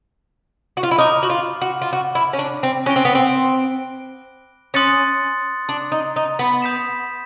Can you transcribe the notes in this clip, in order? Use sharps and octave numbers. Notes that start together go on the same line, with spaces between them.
F#4
F4
E4
D#4 B5 D6 F6
F#4
F4
F#4
F4
F#4
E4
C#4
D4
C4
C#4 F#6 A#6 D7 G7
C4
B3
C4
C#4 C6 D#6 F#6 A6 C#7
D4
D#4
D#4
B3
B5 D#6 G6 B6 E7